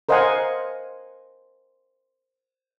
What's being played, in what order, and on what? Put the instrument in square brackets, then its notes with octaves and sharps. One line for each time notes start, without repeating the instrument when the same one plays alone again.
[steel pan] A#4 C5 D#5 F5 F#5 G#5